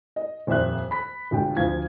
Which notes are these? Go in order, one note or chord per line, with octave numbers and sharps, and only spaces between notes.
D#5
D#1 F2 C5 E5 F#6
B5 B6
G1 B2 G#3 G5
D2 F3 F5 G#6